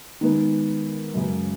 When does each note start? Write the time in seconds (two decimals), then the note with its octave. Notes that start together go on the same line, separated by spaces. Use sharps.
0.21 D#3 G#3 B3 D#4
1.14 F#2 C#3 G#3